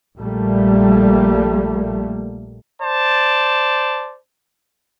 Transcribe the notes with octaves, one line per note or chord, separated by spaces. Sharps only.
A#1 G3 A3 A#3
C5 D5 A5